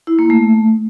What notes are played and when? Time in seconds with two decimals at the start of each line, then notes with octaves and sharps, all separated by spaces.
0.07 E4
0.19 A#3
0.30 A3